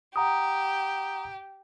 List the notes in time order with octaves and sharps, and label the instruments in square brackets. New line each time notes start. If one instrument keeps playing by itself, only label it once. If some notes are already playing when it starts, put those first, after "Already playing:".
[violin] G4 [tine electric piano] F#5 A#5 D#6